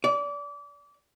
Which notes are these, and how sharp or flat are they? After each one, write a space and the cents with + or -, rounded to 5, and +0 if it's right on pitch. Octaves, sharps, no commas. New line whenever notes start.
D5 -30